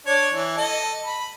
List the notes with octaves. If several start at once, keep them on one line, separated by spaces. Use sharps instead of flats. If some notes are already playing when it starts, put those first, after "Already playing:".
D4 C#5
E3
A4 D#5
B5